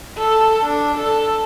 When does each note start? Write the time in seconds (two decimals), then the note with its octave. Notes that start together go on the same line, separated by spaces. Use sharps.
0.18 A4
0.63 D4
0.98 A4